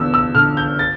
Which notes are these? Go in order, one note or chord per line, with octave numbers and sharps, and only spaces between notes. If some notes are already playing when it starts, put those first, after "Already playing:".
Already playing: E2 D3 E6
E6
D3 F6
G6
A6